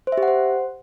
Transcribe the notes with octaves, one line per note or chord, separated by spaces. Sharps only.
C5
E5
G4
F#5
C5